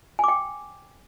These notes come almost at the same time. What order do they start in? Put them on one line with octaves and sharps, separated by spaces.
G#5 D6 G5